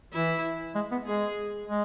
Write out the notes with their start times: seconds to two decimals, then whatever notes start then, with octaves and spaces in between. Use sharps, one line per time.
0.14 E3 E4
0.75 G#3
0.91 B3
1.06 G#3 G#4
1.68 G#3